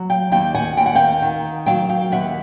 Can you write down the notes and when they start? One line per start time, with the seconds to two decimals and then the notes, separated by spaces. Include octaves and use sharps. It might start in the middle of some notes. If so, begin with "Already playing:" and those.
Already playing: F#3
0.10 F5 G5
0.32 D#2 F5 G5
0.55 F#5 G#5
0.77 D#2 G5
0.86 F#5
0.95 F5 G5
1.22 D#3
1.66 F#3 F5 G5
1.89 F5 G5
2.12 D#2 E5 F#5